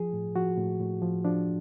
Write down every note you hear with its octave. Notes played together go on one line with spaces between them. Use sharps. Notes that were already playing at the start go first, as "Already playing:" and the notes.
Already playing: F3 G#4
A2
F3 F#4
A2
A2
F3
F3 D4